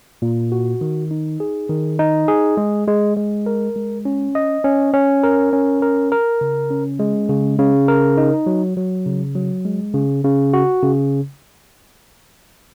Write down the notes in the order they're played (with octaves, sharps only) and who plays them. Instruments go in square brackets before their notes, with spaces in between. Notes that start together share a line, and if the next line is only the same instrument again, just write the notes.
[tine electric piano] A#2
F#4
D#3
D#4
G#4
D#3
D#4
G#4
G#3
G#3
G#3
A#4
G#3
C#4
D#5
C#4
C#4
A#4
C#4
A#4
A#4
C#3
C#4
G#3
C#3
C#3
A#4
D#4
F#3
F#3
C#3
F#3
G#3
C#3
C#3
F#4
C#3